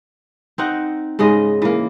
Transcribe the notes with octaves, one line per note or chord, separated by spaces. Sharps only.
C4 D#4 F#5
G#2 C#3 G#3 D#5
E3 A#3